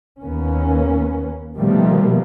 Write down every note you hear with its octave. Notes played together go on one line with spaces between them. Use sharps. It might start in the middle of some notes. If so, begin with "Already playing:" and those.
D#2 A#3 B3 C#4
B2 D#3 F3 G3 A3 A#3